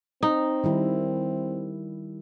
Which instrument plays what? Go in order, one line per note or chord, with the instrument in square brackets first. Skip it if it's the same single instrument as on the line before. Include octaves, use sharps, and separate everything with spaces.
[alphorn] C4 [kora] D#4
[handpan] D#3 G3 E4